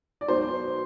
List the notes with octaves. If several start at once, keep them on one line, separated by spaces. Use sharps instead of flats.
D5
B1 B2 C5